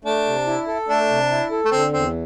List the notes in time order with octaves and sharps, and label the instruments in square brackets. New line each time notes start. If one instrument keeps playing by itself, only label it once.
[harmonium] A3 [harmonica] D4
[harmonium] C3
E4
A4
[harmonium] A3 [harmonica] D4
[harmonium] C3
E4
A4
[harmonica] A3
[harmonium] D3 [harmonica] C4
[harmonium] E2 [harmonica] C4